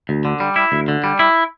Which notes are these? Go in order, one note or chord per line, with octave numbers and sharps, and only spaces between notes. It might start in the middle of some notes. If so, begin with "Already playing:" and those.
D2
D3
G3
E4
D2
D3
G3
E4